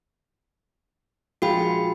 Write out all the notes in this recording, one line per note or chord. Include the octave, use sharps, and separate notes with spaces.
A#1 G#3 F4 F#4 G5 B5